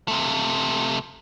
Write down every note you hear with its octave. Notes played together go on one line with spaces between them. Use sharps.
C3 A3